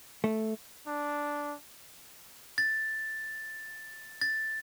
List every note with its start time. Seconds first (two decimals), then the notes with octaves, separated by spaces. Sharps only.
0.24 A3
0.87 D4
2.58 A6
4.21 A6